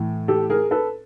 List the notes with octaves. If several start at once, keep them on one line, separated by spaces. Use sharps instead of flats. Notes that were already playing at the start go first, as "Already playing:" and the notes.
Already playing: A2 E3
G4 A4
G#4 A#4
A4 B4